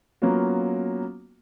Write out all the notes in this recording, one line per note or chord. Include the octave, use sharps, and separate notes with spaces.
F#3 A#3 B3 C#4 F4 F#4